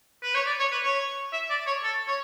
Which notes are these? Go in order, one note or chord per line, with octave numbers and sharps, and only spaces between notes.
B4
C#5
D5
C#5
B4
C#5
E5
D5
C#5
A4
C#5